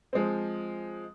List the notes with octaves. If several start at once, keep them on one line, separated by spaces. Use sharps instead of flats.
F3 G#3 C4